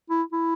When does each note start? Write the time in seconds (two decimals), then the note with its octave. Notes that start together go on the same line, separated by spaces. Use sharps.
0.10 E4
0.32 E4